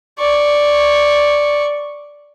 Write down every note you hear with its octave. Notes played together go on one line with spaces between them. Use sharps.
D5 C#6